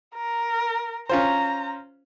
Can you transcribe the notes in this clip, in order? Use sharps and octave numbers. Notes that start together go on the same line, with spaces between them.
A#4
C#4 F4 C5 A#5